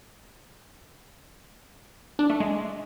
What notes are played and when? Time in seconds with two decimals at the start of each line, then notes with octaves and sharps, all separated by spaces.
2.19 D4
2.30 A3
2.40 G#3